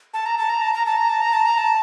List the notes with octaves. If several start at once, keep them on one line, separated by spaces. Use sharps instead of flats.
A5
A#5
A5
A#5
A5
A#5
A5
A#5
A5
A#5
A5
A#5
A5